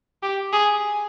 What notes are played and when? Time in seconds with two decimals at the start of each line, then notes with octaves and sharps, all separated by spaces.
0.23 G4
0.53 G#4